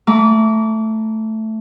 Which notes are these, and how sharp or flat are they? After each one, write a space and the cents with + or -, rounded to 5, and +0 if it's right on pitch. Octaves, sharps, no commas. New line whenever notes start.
A3 +0 A#5 +10 D6 -30